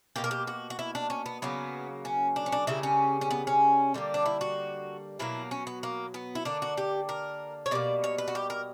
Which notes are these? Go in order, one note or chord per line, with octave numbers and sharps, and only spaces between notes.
B2 A#3 G4
A#4
G4
F#4
F#4
E4
D4
C#4
B3
C#3 F#3 A#3 B3
C#4
D4
C#4
D4
C#3 G3 A#3 E4
C#4
C#4
B3
C#4
D3 G3 A#3
D4
E4
F#4
B2 F#3 A#3 E4
C#4
B3
A#3
B3
E4
D3 A#3 D4
F#4
G4
A#4
C#5
B2 G3 A#3 D5
C#5
B4
F#4
G4
A#4